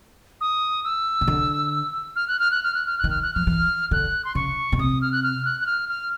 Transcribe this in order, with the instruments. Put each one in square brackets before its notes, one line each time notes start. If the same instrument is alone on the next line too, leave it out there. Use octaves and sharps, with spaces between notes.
[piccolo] D#6
E6
[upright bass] C#3
D3
[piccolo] F6
F#6
F6
F#6
F6
F#6
F6
F#6
[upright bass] D#3
[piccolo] F6
F#6
[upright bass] F3 [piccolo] F6
[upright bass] E3
[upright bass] D3 [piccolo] F#6
[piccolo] C6
[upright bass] C#3 [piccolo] C#6
[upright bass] B2
[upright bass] C3 [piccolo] D#6
[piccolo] F6
F#6
F6
F#6
F#6
F6
F6